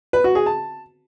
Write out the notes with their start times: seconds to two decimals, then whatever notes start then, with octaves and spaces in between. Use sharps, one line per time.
0.13 B4
0.24 F#4
0.35 G#4
0.46 A5